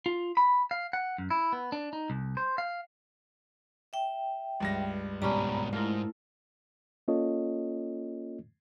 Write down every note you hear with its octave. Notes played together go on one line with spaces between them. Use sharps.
F4
B5
F5
F#5
F#2
E4
B3
D4
D#4
C2
C5
F5
E5 G5
C#2 G2 A#6
G#2 B2 G3 C#4 D4 A#5 B5
G#2 A3 E4 F4 A#4
A#3 C#4 F4 A4 C#5 D#5